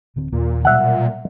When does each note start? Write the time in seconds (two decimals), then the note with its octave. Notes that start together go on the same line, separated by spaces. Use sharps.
0.16 D1 D3 C4
0.32 D#2 A#2
0.65 B2 F#3 G3 E5 F#5